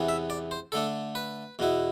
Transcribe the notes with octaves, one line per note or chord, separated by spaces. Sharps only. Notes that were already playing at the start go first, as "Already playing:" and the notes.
Already playing: E2 C3 E3 B3
E5
D5
C5
D3 A3 D4 A4
B4
E2 B2 B3 E4